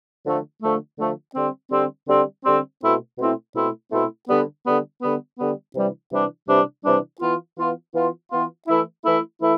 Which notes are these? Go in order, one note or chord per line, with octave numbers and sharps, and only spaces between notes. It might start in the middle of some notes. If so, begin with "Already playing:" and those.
D3 F3 A3
D3 F3 A3
D3 F3 A3
D3 G3 C4
D3 G3 C4
D3 G3 C4
D3 G3 C4
B2 A3 C4 E4
B2 A3 C4 E4
B2 A3 C4 E4
B2 A3 C4 E4
D3 G3 B3
D3 G3 B3
D3 G3 B3
D3 G3 B3
C3 E3 G3 D4
C3 E3 G3 D4
C3 E3 G3 D4
C3 E3 G3 D4
E3 B3 F4
E3 B3 F4
E3 B3 F4
E3 B3 F4
E3 A3 E4
E3 A3 E4
E3 A3 E4